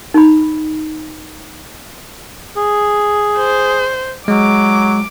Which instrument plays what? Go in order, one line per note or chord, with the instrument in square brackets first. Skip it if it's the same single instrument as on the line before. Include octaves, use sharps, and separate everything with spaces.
[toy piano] D#4 B5
[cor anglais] G#4
[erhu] C5
[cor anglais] F#3 [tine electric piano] G#3 [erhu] D6